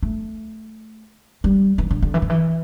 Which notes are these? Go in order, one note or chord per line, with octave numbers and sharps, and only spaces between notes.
A3
G3
E3
D3
D3
E3
D3
E3